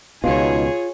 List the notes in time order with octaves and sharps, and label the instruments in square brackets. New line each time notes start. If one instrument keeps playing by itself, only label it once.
[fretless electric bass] C#2 B2 [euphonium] D#4 [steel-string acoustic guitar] F4 [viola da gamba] G#4 C#5